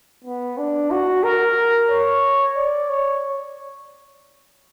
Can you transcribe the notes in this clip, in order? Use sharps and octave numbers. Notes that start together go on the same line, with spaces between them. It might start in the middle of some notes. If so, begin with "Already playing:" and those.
B3
D4
F#4
A#4
C#5
D5
C#5